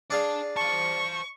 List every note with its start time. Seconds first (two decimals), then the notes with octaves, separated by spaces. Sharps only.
0.11 D4 G#4 D5 F5 A5
0.56 C5 A5 C#6